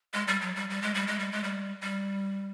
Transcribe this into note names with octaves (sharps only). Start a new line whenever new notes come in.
G#3
G3
F#3
G3
G3
G#3
G3
G#3
G3
G#3
G3
G3